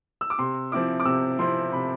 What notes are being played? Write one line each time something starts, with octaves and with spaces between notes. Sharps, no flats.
E6
D6
C3 C6
F3 C4 E4 D6
D6
C3 E6
F3 C4 E4 C6
C3 B5